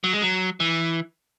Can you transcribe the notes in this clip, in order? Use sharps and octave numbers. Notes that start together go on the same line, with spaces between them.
F#3
G#3
F#3
E3